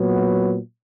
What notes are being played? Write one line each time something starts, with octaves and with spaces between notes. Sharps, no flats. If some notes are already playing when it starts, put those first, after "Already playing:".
Already playing: A#2 F#3 B3